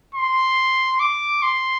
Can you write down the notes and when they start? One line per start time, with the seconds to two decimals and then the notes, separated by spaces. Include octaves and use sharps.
0.15 C6
1.00 D6
1.42 C6